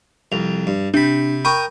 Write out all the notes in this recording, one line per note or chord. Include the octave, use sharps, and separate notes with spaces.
C2 F2 F7
G2
C3 D4 B5
A#4 G5 B5 C#6 D#6